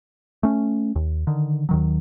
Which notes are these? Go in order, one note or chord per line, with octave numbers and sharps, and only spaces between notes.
A3 C#4
D#2
D3 D#3
D#2 D#3 F#3